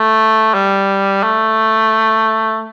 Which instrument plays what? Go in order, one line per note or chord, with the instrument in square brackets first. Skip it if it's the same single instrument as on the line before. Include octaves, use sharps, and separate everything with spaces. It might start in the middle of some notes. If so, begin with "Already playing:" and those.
Already playing: [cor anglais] A3
G3
A3